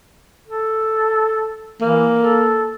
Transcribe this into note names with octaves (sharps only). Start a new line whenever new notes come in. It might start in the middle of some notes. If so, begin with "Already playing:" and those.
A4
E3 A#3
A4